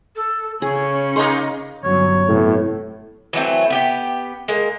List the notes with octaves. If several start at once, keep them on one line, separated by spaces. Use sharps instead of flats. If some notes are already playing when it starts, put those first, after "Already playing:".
A4
C#3 C#4 G#4 C#5
A#3 D#4 G#4 D#5 C6
G1 F#3 C#4 C#5
A2 C3 F#3 B3
E3 F#3 A3 C4
B3 G4 G5
G#3 A#3